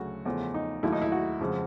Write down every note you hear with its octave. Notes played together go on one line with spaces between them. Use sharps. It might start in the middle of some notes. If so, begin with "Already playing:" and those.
Already playing: D2 C#3 F#3 A3 F#4
E2 C#3 F3 A3
D#4
D#2 D#3 F#3 A3 E4
D#4
E4
F#4
F2 C#3 F3 G#3